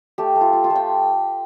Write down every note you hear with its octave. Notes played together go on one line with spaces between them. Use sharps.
A3 G4
A3
F4
F4
F4
A3
G5